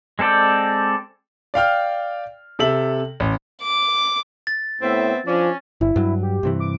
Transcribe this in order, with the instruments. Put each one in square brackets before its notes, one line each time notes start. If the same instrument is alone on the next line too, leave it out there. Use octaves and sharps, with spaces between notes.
[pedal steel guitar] G#3 C4 A4 D5 G5
[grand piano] D5 F5 G5 F6
C3 A4 E5 F#7
A1
[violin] D6
[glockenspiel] A6
[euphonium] A2 [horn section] B3 E5 [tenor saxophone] C4
[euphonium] F3 [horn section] C#4 [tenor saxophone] D4
[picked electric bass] G1 [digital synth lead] E4
[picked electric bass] G2 F#3
[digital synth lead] G4
[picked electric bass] G2 C3 E3
[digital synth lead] D6